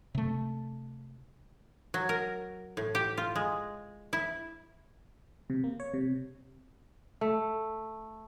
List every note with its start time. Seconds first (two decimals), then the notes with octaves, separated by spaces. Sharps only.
0.15 C3 A3
1.94 F#3
2.09 A#4
2.77 A2
2.95 G4
3.17 F4
3.35 G#3
4.13 E4
5.50 C3
5.64 A#3
5.80 C#5
5.94 C3
7.21 A3